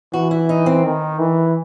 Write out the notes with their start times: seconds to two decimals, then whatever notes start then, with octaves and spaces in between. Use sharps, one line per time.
0.13 E3 F#4
0.31 E4
0.49 D#4
0.66 C4
0.84 D#3
1.19 E3